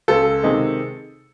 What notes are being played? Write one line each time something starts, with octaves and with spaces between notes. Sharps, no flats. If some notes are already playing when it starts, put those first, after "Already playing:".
C#2 A4
C3 D#3 G#3